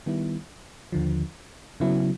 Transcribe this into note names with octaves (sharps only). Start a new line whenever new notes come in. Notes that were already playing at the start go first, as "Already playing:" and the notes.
D#3 G3 B3 E4
D#2 D3 F3
C#3 F#3 B3 E4